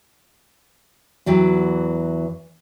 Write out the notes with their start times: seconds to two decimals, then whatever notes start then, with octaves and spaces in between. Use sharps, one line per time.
1.26 E2 E3 F#3 G5